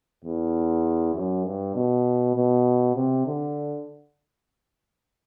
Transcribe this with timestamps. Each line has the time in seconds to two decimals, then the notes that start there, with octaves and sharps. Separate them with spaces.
0.25 E2
1.15 F#2
1.45 G2
1.75 B2
2.36 B2
2.95 C3
3.27 D3